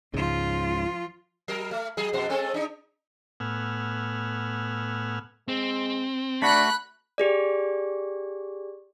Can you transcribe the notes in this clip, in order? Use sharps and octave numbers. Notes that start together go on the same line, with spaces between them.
C#2 G#2 C#3 F3 F4
F#3 A#4
A3
F#3 G#4
F2 B2 C5
G#3 C4 A4
D4 D#4
A2 B3 F#5 G#5 E6 F6
G#3 C4
A3 D4 F#4 B5 F#6
G4 G#4 D5